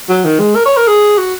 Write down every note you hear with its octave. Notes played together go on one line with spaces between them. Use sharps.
F#3
D#3
G#3
A#4
C#5
A#4
G#4
F#4